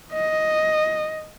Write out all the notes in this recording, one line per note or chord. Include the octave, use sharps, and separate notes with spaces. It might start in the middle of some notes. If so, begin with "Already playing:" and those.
D#5